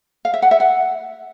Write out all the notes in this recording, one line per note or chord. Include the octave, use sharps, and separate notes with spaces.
F5
E5
F#5
E5
F#5